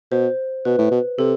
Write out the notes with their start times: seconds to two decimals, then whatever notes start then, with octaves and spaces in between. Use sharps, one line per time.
0.11 B2 C5
0.65 B2 B4
0.78 A2
0.91 B2
1.18 C3 A4